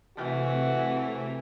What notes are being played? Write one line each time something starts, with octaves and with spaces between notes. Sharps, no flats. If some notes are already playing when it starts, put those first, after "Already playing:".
C3 E3 A3 F#4